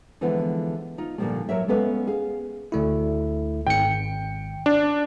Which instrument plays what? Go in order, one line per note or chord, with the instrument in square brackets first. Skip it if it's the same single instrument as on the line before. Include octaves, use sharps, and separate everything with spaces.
[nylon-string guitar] D3 E3 F3 G#3 B3 E4
D#4 F4
A#2 D3 D#3 F3 G3 A3
F#3 A#4 C#5 E5
G#3 B3 C#4 A4 B4 F5
G#4 F5
[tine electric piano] D2 A3 E4
[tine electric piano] G#1 C#7 [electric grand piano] G5
[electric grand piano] D4